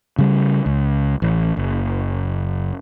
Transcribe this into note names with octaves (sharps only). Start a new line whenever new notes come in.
C#3 G3
C#2
A1
F#1